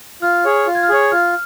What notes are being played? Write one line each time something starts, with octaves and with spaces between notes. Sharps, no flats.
F4 F6
G#4 C#5
F4
G#6
F6
G#4 C#5 G#6
F4 F6